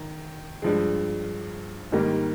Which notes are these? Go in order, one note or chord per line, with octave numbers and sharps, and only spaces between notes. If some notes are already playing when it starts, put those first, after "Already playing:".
Already playing: D#3
G2 F3 G#3
G#2 D#3 G3 A#3